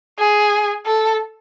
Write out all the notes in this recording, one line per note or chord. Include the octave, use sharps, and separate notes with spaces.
G#4
A4